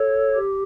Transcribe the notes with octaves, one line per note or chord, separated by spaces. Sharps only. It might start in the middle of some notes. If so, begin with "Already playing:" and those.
Already playing: A4 C#5
G4